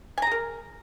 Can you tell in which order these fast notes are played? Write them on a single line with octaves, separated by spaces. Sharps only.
G#5 A#5 G#4 A#4